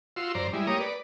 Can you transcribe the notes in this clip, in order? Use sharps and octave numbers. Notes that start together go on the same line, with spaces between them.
F4 F#4 C6 E6
F#2 C5 D5 A#5
G3 G#3 E4
A#3 G4 C#5 A#5 D#6
B4 D5